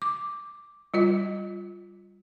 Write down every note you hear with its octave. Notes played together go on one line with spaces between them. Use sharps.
D6
G3 F4 D#5